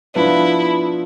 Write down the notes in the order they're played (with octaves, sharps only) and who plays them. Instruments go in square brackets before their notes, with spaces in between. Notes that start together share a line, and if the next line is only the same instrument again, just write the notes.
[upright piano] F3 B3 D4 F4 [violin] E4